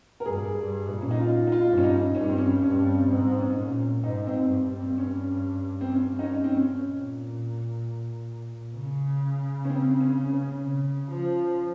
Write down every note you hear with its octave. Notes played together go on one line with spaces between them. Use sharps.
A#4
G2 G#4
G2
A#2
C#4
D#4
F4
D#4
F4
G2
C#4
D#4
G2 C#4
C4
C#4
G2 C#4
C4
G#2 C4
C4
C#4
A#2
G#2 D#4
C4
G2
C4
C#4
C4
C#4
D#4
C#4
C4
C#4
A#2
C#3
C#4
C4
C#4
C#4
C#3
F3